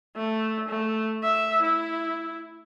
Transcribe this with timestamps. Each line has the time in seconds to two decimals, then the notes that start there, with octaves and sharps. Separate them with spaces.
0.16 A3
0.69 A3
1.23 E5
1.62 E4